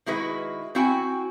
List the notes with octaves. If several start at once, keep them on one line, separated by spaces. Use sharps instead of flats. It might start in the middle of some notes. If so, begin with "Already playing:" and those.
D#3 G#3 E4 F#4 B4
C4 E4 F#4 G5 G#5